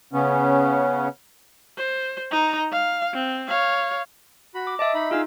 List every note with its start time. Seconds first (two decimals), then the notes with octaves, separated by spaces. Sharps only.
0.13 C#3 B3 C#4
1.78 C5
2.32 D#4 A#5
2.72 F5
3.14 C4
3.48 C#5 F5
4.54 F#4 B5
4.67 D6
4.79 D#5 E5 A5 D6
4.94 D#4 B5
5.11 D#4 F4 G#4 F5 E6